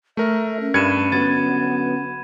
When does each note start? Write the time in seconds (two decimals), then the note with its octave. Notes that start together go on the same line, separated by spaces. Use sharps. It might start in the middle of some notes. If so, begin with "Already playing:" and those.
0.17 A3 A#4 E5
0.60 C#4
0.74 G2 B5 G#6 C#7 D#7 E7
1.12 D3 F#3 B3 G#6 A6